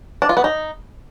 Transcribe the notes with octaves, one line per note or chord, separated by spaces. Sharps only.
D4
F4
B3
D#4